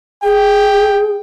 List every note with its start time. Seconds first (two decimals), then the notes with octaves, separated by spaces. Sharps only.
0.24 G#4 G5